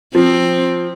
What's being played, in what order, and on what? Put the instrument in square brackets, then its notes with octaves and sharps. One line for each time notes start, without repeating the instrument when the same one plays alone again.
[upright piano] F3 [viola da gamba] C4